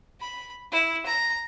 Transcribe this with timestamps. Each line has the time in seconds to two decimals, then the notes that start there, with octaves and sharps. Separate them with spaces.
0.21 B5
0.72 E4
1.06 A#5